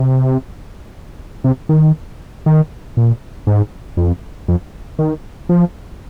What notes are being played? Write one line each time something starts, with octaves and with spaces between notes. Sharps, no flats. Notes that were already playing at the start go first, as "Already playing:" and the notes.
Already playing: C3
C3
D#3
D#3
A#2
G#2
F2
F2
D#3
F3